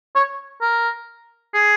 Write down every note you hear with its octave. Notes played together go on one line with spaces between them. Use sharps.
C#5
A#4
G#4